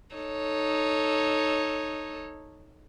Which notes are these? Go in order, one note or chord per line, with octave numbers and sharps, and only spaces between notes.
D#4 A4 C#5